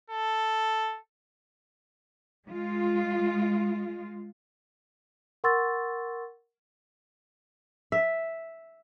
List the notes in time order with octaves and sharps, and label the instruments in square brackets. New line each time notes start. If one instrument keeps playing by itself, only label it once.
[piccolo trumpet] A4
[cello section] G#3 F4
[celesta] A#4 F#5 C6 C#6 E6 A6
[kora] E5